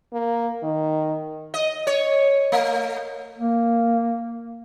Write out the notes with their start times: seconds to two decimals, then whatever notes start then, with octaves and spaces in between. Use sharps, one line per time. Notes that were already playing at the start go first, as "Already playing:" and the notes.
0.13 A#3
0.63 D#3
1.54 D#5
1.87 C#5
2.52 A3
3.38 A#3